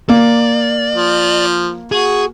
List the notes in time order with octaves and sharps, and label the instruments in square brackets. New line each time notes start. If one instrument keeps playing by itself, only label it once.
[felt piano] A#3 [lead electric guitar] D5
[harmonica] F3
[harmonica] F#4 [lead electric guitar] G#4